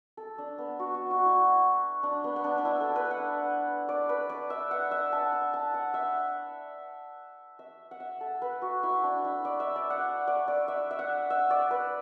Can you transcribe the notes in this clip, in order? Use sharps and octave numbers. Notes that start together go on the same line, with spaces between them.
A4
D4
B3
F#4
F#4
F#4
E4
D4
B3
B3
D4
D4
E4
A4
B4
F#5
D5
B4
D5
E5
F#5
E5
A5
F#5
A5
F#5
E5
E5
F#5
E5
A4
B4
F#4
E4
D4
E4
D5
E5
D5
F#5
D5
D5
E5
E5
F#5
E5
D5
B4